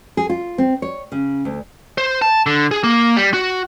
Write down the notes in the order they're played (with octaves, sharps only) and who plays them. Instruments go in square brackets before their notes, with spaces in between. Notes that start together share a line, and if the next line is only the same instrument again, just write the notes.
[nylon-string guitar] G#4
F4
C4
C#5
C#3
D2
[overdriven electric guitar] C5
A5
D3
G#4
A#3
G3
F#4